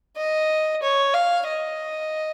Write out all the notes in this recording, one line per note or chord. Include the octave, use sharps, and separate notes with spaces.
D#5
C#5
F5
D#5